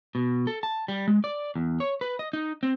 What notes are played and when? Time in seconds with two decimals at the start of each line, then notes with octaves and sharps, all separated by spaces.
0.15 B2
0.47 A4
0.63 A5
0.88 G3
1.08 G#3
1.24 D5
1.56 E2
1.80 C#5
2.01 B4
2.19 D#5
2.33 D#4
2.63 C4